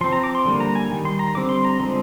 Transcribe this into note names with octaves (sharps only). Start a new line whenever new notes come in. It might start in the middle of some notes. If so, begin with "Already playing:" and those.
F3 C4 C6
A#5
D6
C6
D3 G3 A#3
A#5
G#5
D#3 G3
C6
A#5
D3 G3 C4 D6
C6
A#5
D3 F3 G#3 C4 C6